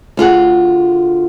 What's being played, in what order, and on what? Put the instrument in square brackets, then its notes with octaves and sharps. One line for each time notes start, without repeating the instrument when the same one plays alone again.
[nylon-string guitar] D2 F4 G#4 F#5